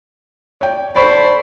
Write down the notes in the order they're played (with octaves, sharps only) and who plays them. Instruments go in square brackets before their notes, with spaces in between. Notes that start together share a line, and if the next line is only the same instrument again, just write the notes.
[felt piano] C#5 G5 [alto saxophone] D5
[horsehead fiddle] A4 C5 [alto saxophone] D5 [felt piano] B5 C#6